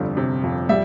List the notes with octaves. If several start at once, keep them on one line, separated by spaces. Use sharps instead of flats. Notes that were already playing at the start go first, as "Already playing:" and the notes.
Already playing: G1 F2 C3 G3
C3
F2
G3 E5